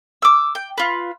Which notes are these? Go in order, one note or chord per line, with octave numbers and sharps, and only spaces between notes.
D6 E6
G5
F4 B4